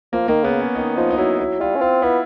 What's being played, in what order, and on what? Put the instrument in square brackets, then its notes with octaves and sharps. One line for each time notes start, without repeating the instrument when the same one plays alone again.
[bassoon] F3 [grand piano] A#3
[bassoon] D#3 [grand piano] A#3
[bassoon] C#3 [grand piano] B3
[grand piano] C#4
[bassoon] D#3 [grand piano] D#4
[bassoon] F3 [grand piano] D#4
[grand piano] D#4
[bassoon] F#3 [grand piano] E4
[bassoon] F#3 [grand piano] E4
[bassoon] G3 [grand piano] F4
[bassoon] C#4
[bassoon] C4 [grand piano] F4
[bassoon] B3 [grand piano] E4